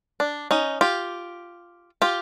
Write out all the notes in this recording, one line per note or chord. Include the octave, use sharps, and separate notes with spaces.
D4
C#4 D#4
F4 G4
F4 G4